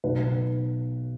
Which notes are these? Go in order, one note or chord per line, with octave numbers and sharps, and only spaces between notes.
B1 B3 B4